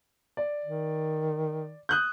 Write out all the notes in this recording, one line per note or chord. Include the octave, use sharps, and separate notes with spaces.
D5
D#3
D#6 F#6 G6